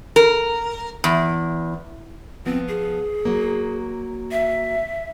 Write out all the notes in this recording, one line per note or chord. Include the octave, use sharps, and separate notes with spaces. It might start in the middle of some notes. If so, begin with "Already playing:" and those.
A#4
E2
F3 B3 C4
G#4
F#3 A#3
E5